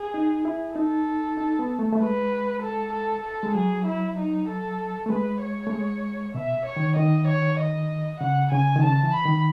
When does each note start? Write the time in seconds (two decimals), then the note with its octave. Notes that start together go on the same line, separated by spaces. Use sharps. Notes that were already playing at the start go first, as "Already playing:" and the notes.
Already playing: G#4
0.14 D#4
0.45 E4
0.76 D#4 A4
1.37 D#4
1.59 B3
1.79 A3
1.92 A3
2.00 G#3 B4
2.62 A4
2.93 A4
3.24 A4
3.43 G#3
3.55 F#3 G#4
3.86 E4
4.17 D#4
4.49 A4
5.06 A3
5.10 G#3 B4
5.42 C#5
5.67 A3
5.72 G#3
6.34 B2 E5
6.66 C#5
6.76 D#3
6.97 D#3 D#5
7.28 C#5
7.59 D#5
8.20 C#3 F#5
8.52 C#3 G#5
8.76 D#3
8.83 C#3 A5
9.03 E3
9.14 B5
9.25 D#3